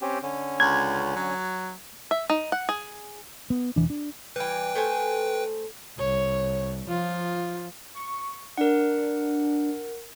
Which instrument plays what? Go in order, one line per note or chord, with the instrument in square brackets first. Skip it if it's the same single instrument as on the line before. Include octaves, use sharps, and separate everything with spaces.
[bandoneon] C4 C#4 G4
D3 C#4
[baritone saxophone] C#2 [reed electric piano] G#6
[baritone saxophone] F#3
[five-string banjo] E5
D#4
F#5
G#4
[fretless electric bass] B3
E1 E3 D4
D4
[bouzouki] E3 G3 [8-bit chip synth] B4 G5
[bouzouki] A3 C5 G#5
[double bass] C2 [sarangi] C#5
[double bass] F3 [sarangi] F4
[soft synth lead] C#6
[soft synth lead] D4 [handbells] A#4 F#5